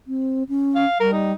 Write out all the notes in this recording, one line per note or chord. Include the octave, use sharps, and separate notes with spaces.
C4
C#4
F5
G3 A#4
D#4